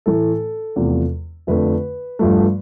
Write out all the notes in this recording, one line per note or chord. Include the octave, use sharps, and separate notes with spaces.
A2 E3 A3 A4
E2 C3 F3 A3
F2 D3 A3 B4
G2 F3 A3